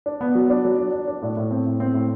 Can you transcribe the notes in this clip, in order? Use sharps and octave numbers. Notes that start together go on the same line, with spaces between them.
D4
B3
F#3
D4
F#3
D4
D4
D4
A2
A2
C4
A2
C4
A2